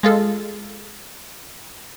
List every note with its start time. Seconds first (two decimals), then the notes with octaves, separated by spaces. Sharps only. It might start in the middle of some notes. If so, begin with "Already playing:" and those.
0.03 G#3 F4 A4